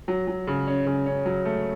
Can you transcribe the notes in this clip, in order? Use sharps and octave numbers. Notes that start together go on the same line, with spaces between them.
F#3
F#3
C#3
C#4
C#3
C#4
F#3
A3